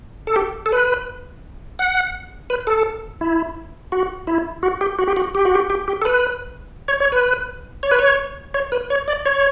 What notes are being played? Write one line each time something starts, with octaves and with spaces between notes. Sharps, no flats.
A4
G4
A4
B4
F#5
B4
A4
E4
F#4
E4
F#4
G4
F#4
G4
F#4
G4
F#4
G4
G4
G4
A4
B4
C#5
C#5
B4
C#5
B4
C#5
C#5
B4
C#5
D5
C#5